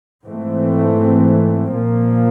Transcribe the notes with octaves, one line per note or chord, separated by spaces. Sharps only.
G#2 E3 A3 C4
A#2 F3 A#3